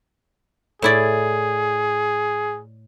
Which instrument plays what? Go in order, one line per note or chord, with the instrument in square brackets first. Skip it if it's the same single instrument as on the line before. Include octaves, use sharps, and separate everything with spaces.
[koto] A2 E4 D5 [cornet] G#4